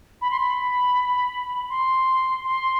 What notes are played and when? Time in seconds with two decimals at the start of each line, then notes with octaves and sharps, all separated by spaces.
0.21 B5
0.31 C6
0.40 B5
1.70 C6
2.44 C6